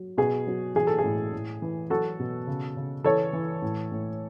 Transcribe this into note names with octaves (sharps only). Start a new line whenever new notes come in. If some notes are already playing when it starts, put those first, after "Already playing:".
Already playing: F#3
B2 G#4
F#3
E3 G#4
A4
A2 G#4
A2
E3
F#3 F#4 A4
B2
C#3
C#3
E3 A4 C#5
E3
A2
A2